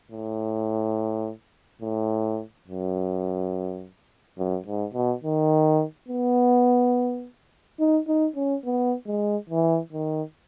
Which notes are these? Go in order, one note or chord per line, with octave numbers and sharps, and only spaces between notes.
A2
A2
F#2
F#2
G#2
B2
D#3
B3
D#4
D#4
C#4
B3
G#3
E3
D#3